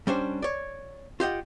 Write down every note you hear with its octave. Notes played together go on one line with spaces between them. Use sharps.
G3 C#4 D4 C5
C#5 D5
F4 G4 D#5 F#5